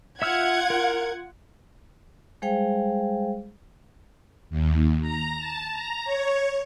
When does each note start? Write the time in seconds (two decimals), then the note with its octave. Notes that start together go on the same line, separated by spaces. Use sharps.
0.22 F4 E5 F#5 E6 F6 G#6
0.70 A#4
2.42 G3 G#3 G#4 C5 F5 G5
4.50 D#2
5.01 A#5
5.38 A5
5.72 A#5
6.05 C#5